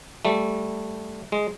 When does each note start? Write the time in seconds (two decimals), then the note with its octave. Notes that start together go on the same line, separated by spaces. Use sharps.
0.25 G3 A3
1.32 G#3